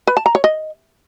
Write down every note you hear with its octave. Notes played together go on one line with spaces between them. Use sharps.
B4
A5
A#5
C#5
D#5